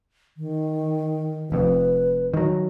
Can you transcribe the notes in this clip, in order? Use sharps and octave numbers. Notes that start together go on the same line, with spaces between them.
D#3
F1 F2 B4
D#3 F#3